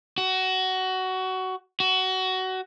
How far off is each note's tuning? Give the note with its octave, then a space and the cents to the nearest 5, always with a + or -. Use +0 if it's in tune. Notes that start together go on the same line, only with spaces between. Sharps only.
F#4 +20
F#4 +20